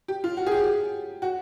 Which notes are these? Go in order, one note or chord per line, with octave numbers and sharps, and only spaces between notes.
G4
F4
F#4
G#4
G4
F#4